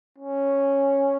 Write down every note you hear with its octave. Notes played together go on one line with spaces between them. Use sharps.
C#4